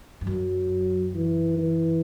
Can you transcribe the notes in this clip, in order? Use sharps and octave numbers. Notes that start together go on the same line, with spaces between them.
G2
F#2 F#3
E3
E3